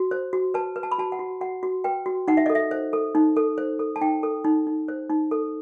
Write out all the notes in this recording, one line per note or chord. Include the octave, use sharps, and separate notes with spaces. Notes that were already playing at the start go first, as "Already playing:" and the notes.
Already playing: F#4
C5
F#4
B4 A5
B4
A5
B5
F#4 A5
F#5
F#4
F#4 F#5
F#4
B4 G5
F#4
D#4 F#5
E5
A4 D#5
E5
C5
A4
D#4
A4
C5
A4
A5
D#4 G5
A4
D#4
D#4
C5
D#4
A4